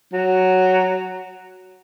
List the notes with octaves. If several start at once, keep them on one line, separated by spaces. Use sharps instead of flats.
F#3